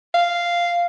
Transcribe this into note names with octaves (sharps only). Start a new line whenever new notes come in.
F5